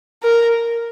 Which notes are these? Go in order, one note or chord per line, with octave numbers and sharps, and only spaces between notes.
A#4